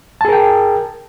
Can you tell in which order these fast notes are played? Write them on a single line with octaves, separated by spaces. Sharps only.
A5 G#4 A#4 G5